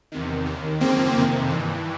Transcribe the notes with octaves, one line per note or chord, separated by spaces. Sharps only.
E2 C3 D#3
D#2 D#3
F#2 C#3 F3 A#3 C4
F2 C3 D#3
G2 E3